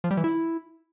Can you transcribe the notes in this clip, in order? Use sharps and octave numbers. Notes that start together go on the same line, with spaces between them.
F3
G3
E3
E4